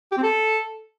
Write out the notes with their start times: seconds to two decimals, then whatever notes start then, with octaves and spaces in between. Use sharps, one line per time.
0.12 G4
0.17 C4
0.23 A4